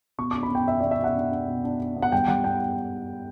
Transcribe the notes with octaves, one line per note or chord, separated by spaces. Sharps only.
B2 C#6
D4 D6
B5
B2 G5
B2 E5
B2 D5
E5
B2 F#5
D4
D4
B2
D4
D4
B3
F#5
G2 G5
G2 F#5
B3 G5